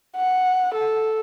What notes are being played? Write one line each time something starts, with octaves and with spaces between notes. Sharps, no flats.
F#5
A4